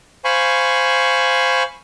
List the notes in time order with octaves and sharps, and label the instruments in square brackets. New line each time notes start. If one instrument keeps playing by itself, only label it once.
[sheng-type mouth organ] C5 F5 G#5 B5 C#6